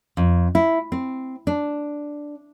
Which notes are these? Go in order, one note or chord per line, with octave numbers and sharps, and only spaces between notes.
F2
E4
C4
D4